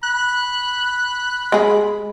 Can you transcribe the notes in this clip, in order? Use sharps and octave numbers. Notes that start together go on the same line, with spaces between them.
B5 F#6
G#3 G#4